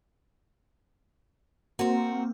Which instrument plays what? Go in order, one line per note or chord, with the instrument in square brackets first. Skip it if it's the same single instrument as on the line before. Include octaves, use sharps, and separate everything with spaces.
[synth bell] A#3 C4 [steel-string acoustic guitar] F#4 A#4